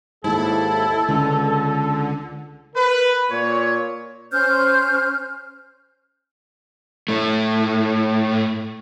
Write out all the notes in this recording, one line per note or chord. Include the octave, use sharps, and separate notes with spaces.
D#2 G#2 E4 A4
C#2 D3
A#4 B4
A#2 C#5
C#4 C5 F6 G6
A2 A3